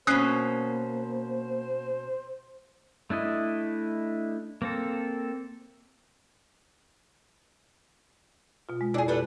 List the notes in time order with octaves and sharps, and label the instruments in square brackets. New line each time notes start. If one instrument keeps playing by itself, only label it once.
[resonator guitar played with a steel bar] B2 C#4 [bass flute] A#3 [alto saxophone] C5 [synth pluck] D#6 F#6 C7
[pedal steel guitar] A3 D4 E4 D#5
A#3 C4 A4
[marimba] B2 F4
G#3
[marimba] F2 B2 E4 [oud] D4 G#4
[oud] B3 D4 A4 [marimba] G4